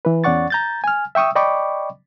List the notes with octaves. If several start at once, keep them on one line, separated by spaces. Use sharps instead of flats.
E3 B4
E2 C#4 D5 F#5 C#6 A6
A#5 G6 A6
G#5 F6
E5 G5 C#6 D#6 E6
D5 D#5 G5 B5 C#6 D6